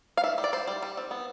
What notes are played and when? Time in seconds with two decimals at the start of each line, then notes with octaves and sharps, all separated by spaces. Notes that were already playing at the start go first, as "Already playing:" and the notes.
0.17 F5
0.24 G3 E5
0.38 G3
0.44 D5
0.52 E4 C5
0.67 G3
0.82 G3
0.97 C4
1.11 B3